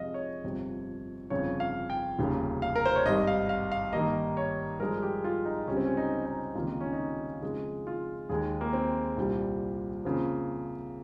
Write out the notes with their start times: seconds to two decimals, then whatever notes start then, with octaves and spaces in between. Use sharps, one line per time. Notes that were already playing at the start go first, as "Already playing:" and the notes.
Already playing: F2 C3 F3 G#3 D#5 F5
0.14 C#5
0.44 G1 F2 C3
1.30 G1 F2 C#3 C#5
1.60 F5
1.90 G5
2.18 F1 D#2 C#3 G3 A#3
2.62 F5
2.75 A#4
2.85 C5
2.96 C#5
3.06 G#1 G2 G3 D#5
3.27 F5
3.49 F5
3.72 F5
3.93 G2 D#3 G3 A#3 D#5
4.37 C#5
4.80 G2 F3 G#3 A#4
5.02 G4
5.24 F4
5.45 D#4
5.67 C#2 C3 G3 C#4
5.77 C4
5.86 C#4
5.97 D#4
6.26 D#4
6.55 C#2 C3 D#3 G3 A#3 F4
6.67 D#4
6.80 C#4
6.93 D#4
7.42 F2 C#3 G#3
7.87 F4
8.29 D#2 D#3 G#3 G#4
8.61 A#3
8.73 C4
9.17 C2 A#2 G3
10.05 F2 C#3 F3 A#3